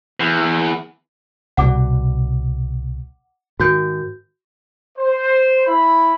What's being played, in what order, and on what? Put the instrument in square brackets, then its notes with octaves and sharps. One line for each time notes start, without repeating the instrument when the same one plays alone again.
[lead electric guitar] E2
[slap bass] C2 B2 G3 [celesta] F#5 D6
[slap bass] G#2 D#3 [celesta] F#4 G6
[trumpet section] C5
E4 B5